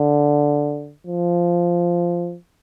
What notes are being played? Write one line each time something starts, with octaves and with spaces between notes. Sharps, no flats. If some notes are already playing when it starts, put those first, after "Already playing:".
Already playing: D3
F3